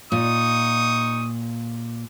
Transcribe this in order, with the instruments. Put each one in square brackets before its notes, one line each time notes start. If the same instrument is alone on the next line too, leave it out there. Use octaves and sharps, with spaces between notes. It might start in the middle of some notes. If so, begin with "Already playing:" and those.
[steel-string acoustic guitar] A#2 [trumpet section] D#4 C#6 D#6